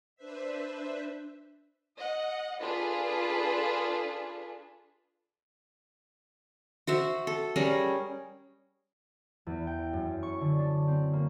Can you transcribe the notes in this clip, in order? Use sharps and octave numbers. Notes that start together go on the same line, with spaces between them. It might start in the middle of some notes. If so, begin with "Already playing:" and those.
D4 B4 C5 E5
D#5 F#5
D4 F4 G#4 A4 B4
F#4 C5 E5
A4
G3 C#4 G#4 A#4
E2
G5
F#2
C#6
D3
D4
C4
A#3